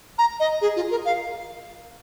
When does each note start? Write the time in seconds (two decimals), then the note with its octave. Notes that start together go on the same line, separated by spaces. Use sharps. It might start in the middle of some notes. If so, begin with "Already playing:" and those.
0.18 A#5
0.40 D#5
0.61 G#4
0.76 F4
0.91 A#4
1.05 F5